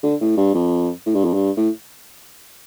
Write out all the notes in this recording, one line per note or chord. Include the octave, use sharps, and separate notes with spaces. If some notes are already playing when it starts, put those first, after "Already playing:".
D3
A2
G2
F2
A2
G2
F2
G2
A2